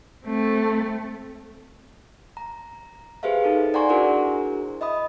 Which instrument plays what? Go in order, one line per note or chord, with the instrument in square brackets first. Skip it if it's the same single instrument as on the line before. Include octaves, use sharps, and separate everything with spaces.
[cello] A3 C4
[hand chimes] A#5
G4 G#4 B4 C5 E5 F5
D#4 A4
D5 F#5 G#5 A#5 C6 C#6
D4 E4 F#4 G#4 A#4 C5
D#5 E5 B5 D#6